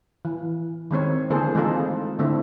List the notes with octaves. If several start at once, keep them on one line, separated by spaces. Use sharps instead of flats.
E3
D#3 G#3 C4 C#5
D3 E3 A#3 G#4 A4 C5
G#3 A3 C4 D#4 F4 A4
D3 A3 C4 E4